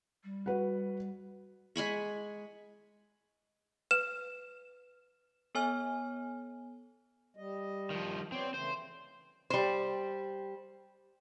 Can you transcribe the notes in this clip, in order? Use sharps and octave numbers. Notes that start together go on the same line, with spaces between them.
G3
F#4 B4 F#5
G#3 G#5 B5 C#6
B4 E7
B3 A4 C#5 G#5 F6
G3 D#5
D#3 F3
B3 C4 C#5 D5
C#3 E3 A3 C5
G3 C5